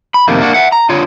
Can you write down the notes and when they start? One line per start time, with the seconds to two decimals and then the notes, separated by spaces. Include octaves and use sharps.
0.14 B5
0.28 F2 C3 D#3 A3 A#3
0.41 A#3 D4 F#4
0.54 E5 F#5
0.72 A#5
0.89 D3 F4 C#5